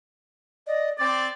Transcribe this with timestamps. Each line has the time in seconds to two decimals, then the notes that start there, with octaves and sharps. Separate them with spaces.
0.67 D5 D#5
0.98 C4 D5 D6 A6